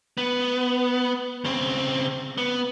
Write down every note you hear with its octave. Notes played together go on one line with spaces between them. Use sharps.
B3
C#3 C4
B3